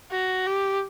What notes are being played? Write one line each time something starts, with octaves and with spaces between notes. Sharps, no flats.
F#4
G4